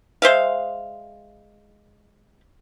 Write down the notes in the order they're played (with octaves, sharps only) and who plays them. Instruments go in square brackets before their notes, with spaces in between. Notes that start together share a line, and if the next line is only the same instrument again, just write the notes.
[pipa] G#3 C5 E5 F5